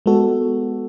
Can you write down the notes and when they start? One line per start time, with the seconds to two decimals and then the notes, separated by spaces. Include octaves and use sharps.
0.06 G#3 B3 F#4 A4